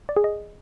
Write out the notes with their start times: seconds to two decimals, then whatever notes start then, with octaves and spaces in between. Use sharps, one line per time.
0.09 D5
0.16 G#4
0.24 D#5